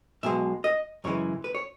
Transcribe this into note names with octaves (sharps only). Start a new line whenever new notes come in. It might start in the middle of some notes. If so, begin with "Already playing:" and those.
B1 B2 G#3 E5
D#5
F#2 C#3 E3 G#3 C#5
B4
C#5